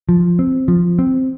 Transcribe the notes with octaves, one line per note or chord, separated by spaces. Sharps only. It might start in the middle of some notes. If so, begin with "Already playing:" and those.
F3
C4
F3
C4